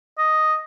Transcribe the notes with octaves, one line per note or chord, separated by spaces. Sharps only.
D#5